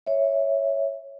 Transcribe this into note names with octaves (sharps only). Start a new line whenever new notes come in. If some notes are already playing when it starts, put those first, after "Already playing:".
C#5 E5